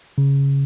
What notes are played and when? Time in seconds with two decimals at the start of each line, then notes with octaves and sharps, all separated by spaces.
0.18 C#3